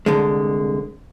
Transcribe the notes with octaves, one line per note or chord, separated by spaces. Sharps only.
C2 D3 G#3